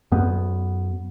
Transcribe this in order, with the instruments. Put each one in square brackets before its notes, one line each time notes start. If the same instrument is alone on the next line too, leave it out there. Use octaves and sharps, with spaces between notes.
[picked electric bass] F#2 B3